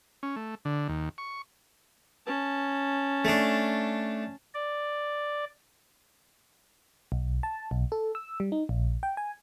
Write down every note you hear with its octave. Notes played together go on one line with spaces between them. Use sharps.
C#4
A3
D3
D#2
C#6
C#4 A5
A3 D4
D5
B1
A5
B1
A4
E6
G3
D#4
A#1
G5
G#5